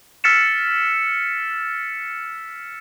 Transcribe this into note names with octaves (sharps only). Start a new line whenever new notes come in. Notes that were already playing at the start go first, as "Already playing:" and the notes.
E6 F6 A6 B6 C#7 E7